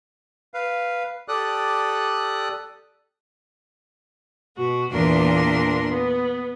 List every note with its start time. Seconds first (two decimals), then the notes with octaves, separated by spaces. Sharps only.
0.54 B4 F5
1.28 G4 A4 D5 D#6 F#6
4.57 B2 F#4
4.90 E2 A#2 E3 D4 A#4 C6
5.89 B3